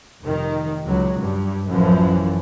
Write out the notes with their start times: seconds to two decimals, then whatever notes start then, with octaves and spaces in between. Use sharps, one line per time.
0.22 F1 D#3
0.86 C#2 F#3
1.19 G2
1.68 A1 F#2 E3 F3